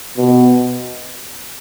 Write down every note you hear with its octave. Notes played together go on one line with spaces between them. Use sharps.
B2